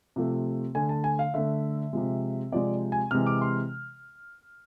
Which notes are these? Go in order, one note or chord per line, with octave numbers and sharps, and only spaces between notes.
C3 F3 A3
D3 A3 G#5
A5
G#5
F5
D3 A3 E5
C3 F3 G#3
C3 F3 G#3 D5
G#5
C3 E3 G#3 F6
D6
C6